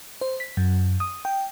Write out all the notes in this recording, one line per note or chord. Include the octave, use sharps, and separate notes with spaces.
C5
B6
F#2
D#6
G5